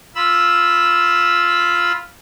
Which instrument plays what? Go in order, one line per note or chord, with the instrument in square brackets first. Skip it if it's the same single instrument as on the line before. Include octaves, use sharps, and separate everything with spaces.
[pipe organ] F4 B5 E6